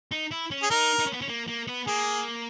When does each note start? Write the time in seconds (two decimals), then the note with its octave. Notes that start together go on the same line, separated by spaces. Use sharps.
0.12 D#4
0.31 E4
0.51 C#4
0.63 G#4
0.70 D#4 A#4
0.99 D#4
1.06 C#4
1.13 B3
1.21 C#4
1.28 A#3
1.48 A#3
1.67 B3
1.87 A#3 G#4